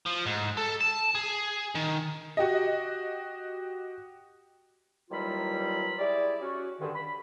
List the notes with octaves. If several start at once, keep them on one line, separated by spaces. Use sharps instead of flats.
F3
G#2
A4
A5
G#4
D#3
F#4 G4 D#5
D#2 E3 F#3 G3 F4 B5
E4 G4 G#4 D5
C#4 F#4
G2 D3 D#3
B5